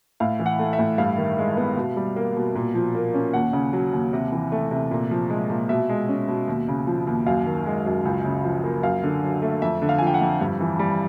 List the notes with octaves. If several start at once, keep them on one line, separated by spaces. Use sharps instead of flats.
A2 F5
E3
F#5
A3
E5
A2
G2 F5
D#3
G#3
B3
B2
G3
A#3
B2
A#2
F3
A#3
C#4
D#2 F#5
C#3
F#3
D#2
C3
E3
A3
C3
A#2
F3
G#3
A#2
B2 E5
G#3
C#4
B2
D#2
C#3
F3
D#2
F#2 F5
D#3
G#3
F#2
C#2
C#3
F3
A#3
F#2 F5
D3
F#3
A3
F2 E5
D3
F5
F3 G#5
G5
F#5
F2
G2
E3
G3